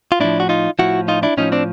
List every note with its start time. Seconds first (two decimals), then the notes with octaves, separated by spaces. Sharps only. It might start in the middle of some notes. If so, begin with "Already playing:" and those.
0.12 F4
0.20 A2 F3 D4 E4
0.40 F#4
0.49 D#4 F4
0.79 A2 F3 E4 F#4
1.08 D#4 F4
1.23 D4 E4
1.37 A2 F3 C#4 D#4
1.52 C4 D4